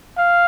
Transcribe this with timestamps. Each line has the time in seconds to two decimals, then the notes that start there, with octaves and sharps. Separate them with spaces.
0.18 F5